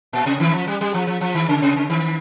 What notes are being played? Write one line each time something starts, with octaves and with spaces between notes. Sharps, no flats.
A#2
C3
D#3
F3
G3
G3
F3
F3
F3
D#3
C#3
C3
C#3
D#3